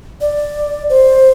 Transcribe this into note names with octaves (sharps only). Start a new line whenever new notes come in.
D5
C5